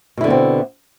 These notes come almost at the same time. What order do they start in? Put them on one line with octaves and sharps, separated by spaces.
B2 E4 D3 B3 C4